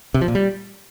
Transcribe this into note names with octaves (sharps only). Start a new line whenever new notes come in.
C3
F3
A#2
G3